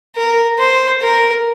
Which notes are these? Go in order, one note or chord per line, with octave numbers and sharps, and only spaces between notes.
A#4
C5
A#4